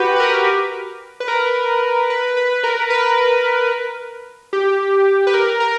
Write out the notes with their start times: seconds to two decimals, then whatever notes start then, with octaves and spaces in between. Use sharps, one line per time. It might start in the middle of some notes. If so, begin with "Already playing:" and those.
Already playing: F#4 G4 B4
0.16 B4
0.20 A#4
1.20 B4
1.28 A#4
2.10 B4
2.37 B4
2.63 A#4
2.90 B4
4.53 G4
5.27 B4
5.34 A#4
5.60 A#4